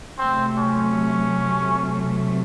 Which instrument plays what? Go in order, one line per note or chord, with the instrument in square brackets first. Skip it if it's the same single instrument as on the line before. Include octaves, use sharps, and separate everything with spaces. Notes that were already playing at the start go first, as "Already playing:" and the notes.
[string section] C3 F#3 A3 [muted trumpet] C4
[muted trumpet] C#4